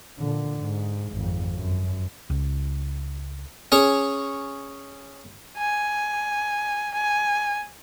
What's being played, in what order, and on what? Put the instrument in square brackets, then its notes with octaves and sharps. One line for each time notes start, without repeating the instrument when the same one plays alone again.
[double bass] A#2 D3
G#2
G#1 F2
F#2
[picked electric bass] C#2
[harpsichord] C#4 G#4 C#5
[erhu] G#5
G#5